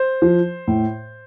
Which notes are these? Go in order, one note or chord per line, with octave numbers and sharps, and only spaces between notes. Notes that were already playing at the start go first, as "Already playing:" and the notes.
Already playing: C5
F3
A2